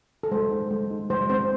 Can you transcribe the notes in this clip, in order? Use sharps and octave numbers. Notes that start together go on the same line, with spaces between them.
A4
G#3 C5
D#4
G#3
D#4
G#3 C5
C4 C5